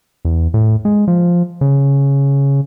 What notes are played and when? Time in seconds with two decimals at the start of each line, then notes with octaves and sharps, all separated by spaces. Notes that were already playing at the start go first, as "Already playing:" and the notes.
0.25 E2
0.54 A2
0.85 G#3
1.08 F3
1.61 C#3